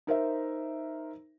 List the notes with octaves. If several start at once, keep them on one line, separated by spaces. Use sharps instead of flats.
D#4 A#4 C5 E5